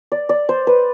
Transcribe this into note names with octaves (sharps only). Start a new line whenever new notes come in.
D5
D5
C5
B4